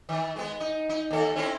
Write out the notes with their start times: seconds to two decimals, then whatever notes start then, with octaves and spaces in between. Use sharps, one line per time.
0.09 D#3
0.36 G#3 B3
0.60 D#4
0.89 D#4
1.11 D#2 A4
1.36 C4 C#4 E4